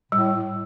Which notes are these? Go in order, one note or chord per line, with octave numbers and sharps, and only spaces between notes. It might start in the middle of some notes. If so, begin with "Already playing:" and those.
A2 G3